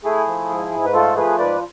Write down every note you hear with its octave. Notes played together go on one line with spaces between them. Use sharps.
A3 E4 G#4
F3
G#2
G#2
B4
A3 F4 A4
F3 G#4 B4
G#2 B4 D5